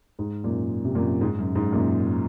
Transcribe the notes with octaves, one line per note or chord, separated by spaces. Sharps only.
G#2
F#2 A#2
C3
F#2 A#2
G#2
F#2
G#2
F#2 A#2